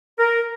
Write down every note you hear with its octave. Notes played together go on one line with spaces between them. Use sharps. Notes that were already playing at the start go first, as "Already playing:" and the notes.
A#4